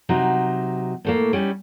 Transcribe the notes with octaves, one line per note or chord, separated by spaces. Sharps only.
C3 F#3 D#4
A2 A3 A#3
G3 C#4 D#4